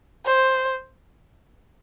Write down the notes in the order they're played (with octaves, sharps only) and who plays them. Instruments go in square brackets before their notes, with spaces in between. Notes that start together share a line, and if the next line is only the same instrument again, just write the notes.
[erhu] C5